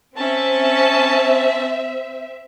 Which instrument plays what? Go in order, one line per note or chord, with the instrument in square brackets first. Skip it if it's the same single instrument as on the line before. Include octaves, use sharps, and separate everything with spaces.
[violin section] C4 E5 [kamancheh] C#4 A5